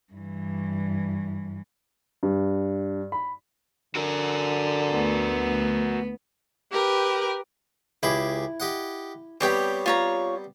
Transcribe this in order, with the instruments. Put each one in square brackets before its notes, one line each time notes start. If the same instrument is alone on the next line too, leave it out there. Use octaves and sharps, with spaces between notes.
[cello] G2 E3
[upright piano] G2
B5
[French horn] D3 [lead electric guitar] F#4 A#4
[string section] D2 [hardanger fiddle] B3
[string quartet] G4 A#4 B4
[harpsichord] C#2 G4 G#4 [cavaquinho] E4
[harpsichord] G4 D#5 F#5
[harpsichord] G3 B3 C4 [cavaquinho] G4 C#5 G5
[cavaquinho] F4 C#5 A#5